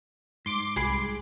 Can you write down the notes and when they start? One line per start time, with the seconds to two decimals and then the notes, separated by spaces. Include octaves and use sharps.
0.46 G#2 C6 D6 D7
0.76 C2 G#4 B5